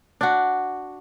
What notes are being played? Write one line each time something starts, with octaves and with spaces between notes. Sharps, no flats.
D4 F#4